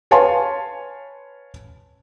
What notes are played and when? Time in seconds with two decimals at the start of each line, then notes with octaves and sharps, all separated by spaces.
0.11 B4 C#5 F5 G#5 A5 C6